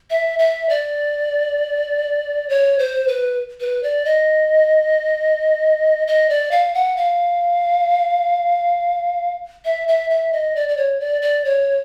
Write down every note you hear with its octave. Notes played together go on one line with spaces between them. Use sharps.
E5
E5
D5
C#5
C5
B4
B4
D5
D#5
D#5
D5
F5
F#5
F5
E5
E5
E5
D#5
D5
D5
C#5
D5
D5
C#5